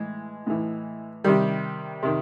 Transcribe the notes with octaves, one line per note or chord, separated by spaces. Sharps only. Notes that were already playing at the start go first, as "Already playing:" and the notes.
Already playing: A2 E3 G#3
A2 E3
C3 D#3 G3
C3 D#3